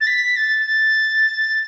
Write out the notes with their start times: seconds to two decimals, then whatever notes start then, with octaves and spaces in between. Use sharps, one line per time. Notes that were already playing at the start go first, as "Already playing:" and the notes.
0.01 A6
0.07 B6
0.36 A6
0.66 A6